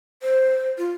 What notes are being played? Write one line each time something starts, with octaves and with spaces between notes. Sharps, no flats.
C5
F4